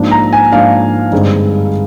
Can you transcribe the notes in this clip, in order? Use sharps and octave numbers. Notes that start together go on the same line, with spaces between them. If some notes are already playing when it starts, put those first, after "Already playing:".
Already playing: G#2 F3 A#3 D4
A#5
G#5
G#2 F3 A#3 D4 F5
G2 D3 G#3 C4 D#4